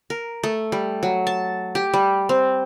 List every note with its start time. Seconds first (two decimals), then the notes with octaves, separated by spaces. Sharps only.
0.10 A#4
0.43 A3
0.72 G3
1.03 F#3
1.27 A5
1.75 G4
1.94 G3
2.29 C4